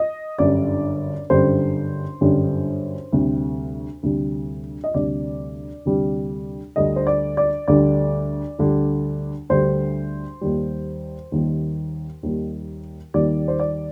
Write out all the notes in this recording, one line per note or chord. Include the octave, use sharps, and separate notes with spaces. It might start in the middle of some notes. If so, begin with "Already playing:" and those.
Already playing: D#5
G1 F#2 D3 G3 D5
G1 F#2 D3 G3 C5
G1 F#2 D3 G3
D2 C3 G3
D2 C3 G3
D#5
D2 C3 G3 D5
D2 C3 G3
D2 D3 G3 D#5
C5
D5
D5
D2 D3 G3 D5
D2 D3 G3
D2 D3 G3 C5
D#2 D#3 G3
D#2 D#3 G3
D#2 D#3 G3
D#2 D#3 G3 D5
C5
D5